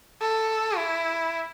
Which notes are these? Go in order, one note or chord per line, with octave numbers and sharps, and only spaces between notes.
A4
E4